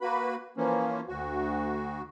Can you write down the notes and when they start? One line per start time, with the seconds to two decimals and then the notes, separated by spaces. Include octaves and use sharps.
0.01 A#3 F#4 B4 B5
0.57 E3 F3 A#3 C#4
1.08 D2 F#4